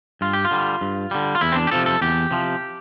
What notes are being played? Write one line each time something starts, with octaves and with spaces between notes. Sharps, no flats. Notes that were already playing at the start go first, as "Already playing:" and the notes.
G2 F4
G4
F4
D3 G3
G2
D3 G3
F4
E2 E4
C4
D4
G4
C3 F3 A4
A4
E2 G4
C3 F3